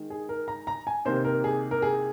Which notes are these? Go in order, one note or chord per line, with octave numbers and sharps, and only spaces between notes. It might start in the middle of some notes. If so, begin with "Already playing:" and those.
Already playing: D#3 G#3
G#4
A#4
A#5
A#5
G#5
C3 D#3 A#3 C5
A#4
G#4
A#4
G#4